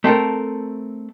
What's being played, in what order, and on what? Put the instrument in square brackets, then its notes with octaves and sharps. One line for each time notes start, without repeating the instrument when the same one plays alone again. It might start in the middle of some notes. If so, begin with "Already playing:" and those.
[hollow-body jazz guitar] A3 C4 A4 A#4